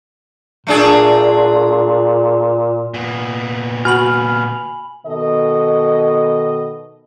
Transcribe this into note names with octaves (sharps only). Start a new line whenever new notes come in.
A#2 A3 D4 G#4
A#2 B3
F#4 G#5 B5 F6 F#7
B2 D#3 A4 D#5